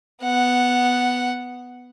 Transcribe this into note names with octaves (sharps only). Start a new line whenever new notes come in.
B3 F#5